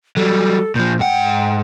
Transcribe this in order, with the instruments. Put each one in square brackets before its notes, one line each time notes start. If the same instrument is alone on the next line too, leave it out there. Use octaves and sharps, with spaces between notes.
[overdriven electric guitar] F#3 G3 [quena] A4
[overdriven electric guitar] A#2 F3 [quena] G6
[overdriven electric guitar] G#2 F#5 [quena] G5